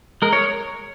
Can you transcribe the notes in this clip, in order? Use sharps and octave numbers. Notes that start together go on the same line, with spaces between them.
G#3 A#4
C#5